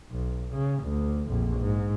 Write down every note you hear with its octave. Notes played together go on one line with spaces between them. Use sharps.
B1
C#3
D2
A#1 F2
G#2